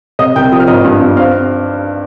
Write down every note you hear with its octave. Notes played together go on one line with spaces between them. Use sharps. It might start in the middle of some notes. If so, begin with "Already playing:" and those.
C3 D#5 D#6
C2 G5 G6
F3 D#6
F6
G#1 D#5 D#6
G2
G2
C4 F5 F6